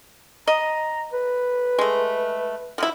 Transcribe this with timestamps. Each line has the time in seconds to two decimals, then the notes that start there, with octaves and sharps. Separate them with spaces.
0.47 D#5 A#5
1.12 B4
1.79 G#3 A3
2.78 F3 F#3 E4